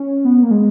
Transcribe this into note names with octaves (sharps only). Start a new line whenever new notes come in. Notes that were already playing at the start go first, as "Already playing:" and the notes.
Already playing: C#4
B3
A#3
G#3